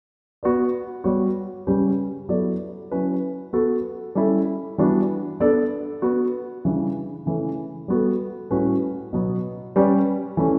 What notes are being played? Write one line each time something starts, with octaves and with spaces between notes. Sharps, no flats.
B3 F#4 B4 D5
G3 B3 F#4 C#5
C#3 G3 C#4 G4 B4
F#3 B3 E4 A4 D5
F#3 C#4 E4 B4
B3 F#4 A4
G3 C#4 E4 A4
E3 G3 B3 D4 F#4
B3 D4 A4 D5
B3 F#4 B4
C#3 E3 G3 D4
C#3 E3 A3 C#4
G3 B3 F#4 A4
A2 G3 C#4 F#4 B4
B2 F#3 B3
G3 C#4 G4 B4 D5
E3 A3 C#4